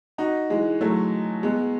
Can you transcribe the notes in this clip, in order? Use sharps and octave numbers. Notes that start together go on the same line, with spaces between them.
D#4 F#4
E3 G#3
F#3 A3
G#3 B3